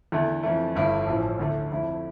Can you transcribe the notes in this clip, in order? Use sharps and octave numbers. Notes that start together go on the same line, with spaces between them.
E2 D3 A3
F2 E3 A3
G1 G2 D3 A3 E4
A1 A2 F3
D2 D3 A3
F2 D3 A3 E4